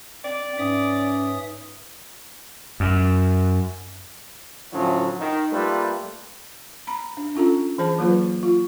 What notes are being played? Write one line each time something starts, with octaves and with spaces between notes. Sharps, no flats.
C4 D5
G#2 C#4 B4 E5 D#6
F#2
A2 D3 F3 F#3 C#4 E4
D#3
G3 A3 A#3 F4 A4 B4
A#5 B5
D4
C#4 F4 A4 A#5
E3 G#4 C5 A5
F#3 A#3 F4 B4
F4